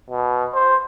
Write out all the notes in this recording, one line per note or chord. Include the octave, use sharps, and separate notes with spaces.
B2
C5